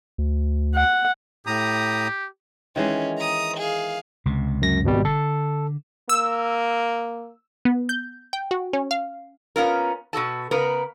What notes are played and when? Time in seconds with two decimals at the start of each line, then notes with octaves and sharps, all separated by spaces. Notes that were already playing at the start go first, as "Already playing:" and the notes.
0.18 D2
0.75 F#5
1.47 A2 G4 A#5 D#6
2.76 D#3 E3 G#3 C#4
3.18 A#5 D#6
3.57 G#4 F5
4.26 C#2 C3
4.62 F#2 A#6
4.84 G#1 B2 G3
5.05 D3 A4
6.09 A#3 E6
7.65 B3
7.89 G6
8.33 G5
8.51 F#4
8.73 C#4
8.91 F5
9.56 B3 C#4 F4 A#4
10.13 B2 F#4 A4 A5
10.51 C#3 B3 A#4 B4